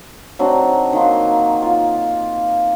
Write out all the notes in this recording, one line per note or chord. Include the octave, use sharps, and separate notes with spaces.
F#3 C4 D4 D#4
D#3 A#3 C6
F4